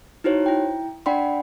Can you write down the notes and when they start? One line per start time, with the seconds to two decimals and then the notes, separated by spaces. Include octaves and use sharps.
0.24 D#4 E4 F#4 C5 C#5
0.46 E4 G5
1.06 D4 D5 F#5 G5 B5 C6